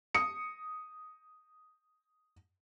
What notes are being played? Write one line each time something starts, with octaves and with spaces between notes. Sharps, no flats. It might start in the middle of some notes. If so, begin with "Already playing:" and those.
D#6 C#7